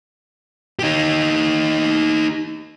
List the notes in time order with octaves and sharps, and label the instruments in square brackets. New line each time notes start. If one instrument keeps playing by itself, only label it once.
[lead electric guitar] D#4 G4